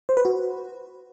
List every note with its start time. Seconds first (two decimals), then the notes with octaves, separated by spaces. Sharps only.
0.09 C5
0.17 B4
0.25 F#4